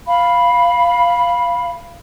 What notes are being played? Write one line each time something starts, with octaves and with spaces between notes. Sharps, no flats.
F5 B5